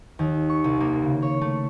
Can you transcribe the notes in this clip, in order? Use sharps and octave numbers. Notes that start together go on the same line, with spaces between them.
D#2
C#6
C2
A#3
C#3
C#5
A3